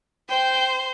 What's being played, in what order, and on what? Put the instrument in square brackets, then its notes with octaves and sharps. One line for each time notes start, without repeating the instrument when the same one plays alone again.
[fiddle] C5 [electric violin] G5